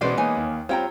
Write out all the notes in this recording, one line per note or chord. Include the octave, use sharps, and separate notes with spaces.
B2 E3 G#3 B3 C#4 C5 D5
A#3 D#4 C#5 G#5
D#2
G3 C4 F4 C#5 G5 A#5